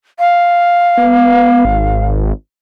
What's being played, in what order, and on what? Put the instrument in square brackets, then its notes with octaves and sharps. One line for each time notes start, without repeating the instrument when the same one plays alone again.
[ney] F5
[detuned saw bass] B3
G#1